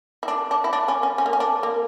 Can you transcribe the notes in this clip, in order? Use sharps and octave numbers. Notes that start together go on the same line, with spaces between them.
E4
D4
D4
E4
D4
C#4
C#4
C#4
A#3
C#4
D4
A#3